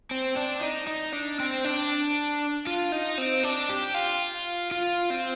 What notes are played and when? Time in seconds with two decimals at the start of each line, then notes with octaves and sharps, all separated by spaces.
0.11 C4
0.37 D4
0.63 D#4
0.87 D#4
1.13 D4
1.40 C4
1.64 D4
2.67 F4
2.92 D#4
3.18 C4
3.43 D4
3.69 G4
3.94 F4
4.71 F4
5.10 C4